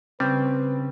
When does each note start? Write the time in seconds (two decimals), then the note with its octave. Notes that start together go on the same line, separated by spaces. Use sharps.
0.20 C#3 G3 C4 B4